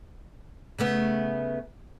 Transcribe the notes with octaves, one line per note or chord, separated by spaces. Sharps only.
C#3 A3 B3